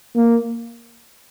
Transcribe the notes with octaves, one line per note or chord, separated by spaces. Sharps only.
A#3